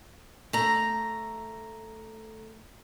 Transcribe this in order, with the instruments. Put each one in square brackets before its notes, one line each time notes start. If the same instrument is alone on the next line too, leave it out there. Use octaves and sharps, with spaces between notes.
[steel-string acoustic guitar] A3 A#5